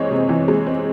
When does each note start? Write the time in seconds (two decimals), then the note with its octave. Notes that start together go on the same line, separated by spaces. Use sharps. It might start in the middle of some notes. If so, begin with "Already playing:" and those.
Already playing: C3 E3 G#3 C4 C#5 D#5
0.11 C3
0.29 E3
0.48 G#3
0.66 C4